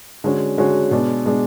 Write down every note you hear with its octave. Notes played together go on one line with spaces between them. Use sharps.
D3 G#3 C#4 F#4
D3 G#3 C#4 F#4
B2 G#3 D4
B2 G#3 D4